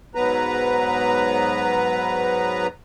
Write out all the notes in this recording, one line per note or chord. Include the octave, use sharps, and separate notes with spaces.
G#2 F#3 B3 B4 A#5